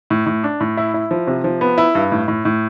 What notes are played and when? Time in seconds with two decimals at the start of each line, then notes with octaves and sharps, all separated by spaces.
0.10 A2
0.26 A2
0.44 D4
0.60 A2
0.77 E4
0.94 E4
1.11 F3
1.27 C3
1.44 F3
1.61 B3
1.78 E4
1.95 G2
2.12 A2
2.28 A2
2.45 A2